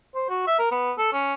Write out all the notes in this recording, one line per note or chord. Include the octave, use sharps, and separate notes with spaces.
C5
F#4
E5
A#4
B3
A4
C#4